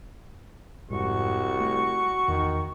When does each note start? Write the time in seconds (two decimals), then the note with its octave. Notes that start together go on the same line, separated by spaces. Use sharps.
0.90 F1 C2 G#2 F#4 C#6
1.60 A3
2.28 E2 D#3